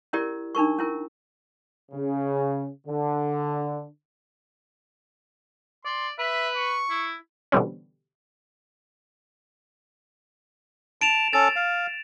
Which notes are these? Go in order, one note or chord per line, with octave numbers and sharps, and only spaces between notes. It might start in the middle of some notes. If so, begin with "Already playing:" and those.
C#4 E4 G4 A#4 D5
D4 D#4 A#4 C#6
C#4 E4 A#4
C#3
D3
D5 C6
B4 E5
C#6
E4
B2 D3 E3 G3 C4 C#4
A5 D7 E7 F7
C#4 A4 A6
F5